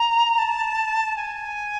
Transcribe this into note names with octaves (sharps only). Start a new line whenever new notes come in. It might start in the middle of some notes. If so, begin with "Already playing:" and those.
Already playing: A#5
A5
G#5